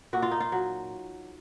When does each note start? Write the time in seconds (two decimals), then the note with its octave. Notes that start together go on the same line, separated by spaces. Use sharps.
0.13 A#2 F#4
0.22 F4
0.31 D#4
0.40 F4
0.52 F#3